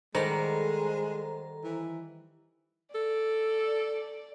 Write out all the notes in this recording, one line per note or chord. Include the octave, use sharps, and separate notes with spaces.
D#3 G3 G#3 A4 C5 F#5 A#5
E3
A4 D5